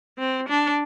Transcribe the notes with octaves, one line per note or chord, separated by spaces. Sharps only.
C4
D4